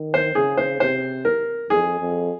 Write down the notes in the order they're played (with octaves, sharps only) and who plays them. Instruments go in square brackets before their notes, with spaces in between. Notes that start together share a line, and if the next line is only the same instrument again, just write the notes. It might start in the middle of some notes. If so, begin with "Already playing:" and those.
Already playing: [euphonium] D#3
[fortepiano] C5
[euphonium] C#3 [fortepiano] G#4
[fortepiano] C5
[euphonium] C3 [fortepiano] C5
[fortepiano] A#4
[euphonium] F2 [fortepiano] G#4
[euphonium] F2